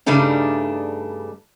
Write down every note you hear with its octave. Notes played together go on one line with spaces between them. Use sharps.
G2 C#3 G3 A3 D4 D#4